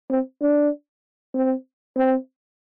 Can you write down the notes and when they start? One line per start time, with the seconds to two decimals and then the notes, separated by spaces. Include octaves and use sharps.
0.10 C4
0.41 D4
1.34 C4
1.96 C4